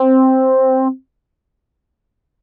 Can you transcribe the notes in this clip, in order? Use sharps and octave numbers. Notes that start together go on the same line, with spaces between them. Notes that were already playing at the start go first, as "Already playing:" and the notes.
Already playing: C4